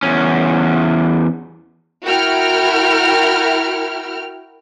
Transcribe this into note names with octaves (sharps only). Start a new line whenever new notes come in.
E2 C#4
E4 F#4 A#4 G5 F6